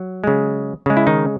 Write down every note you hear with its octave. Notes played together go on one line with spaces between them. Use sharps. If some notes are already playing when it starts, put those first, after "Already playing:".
Already playing: F#3
C#3 G#3
C#3 G#3
E4
D#3 D#4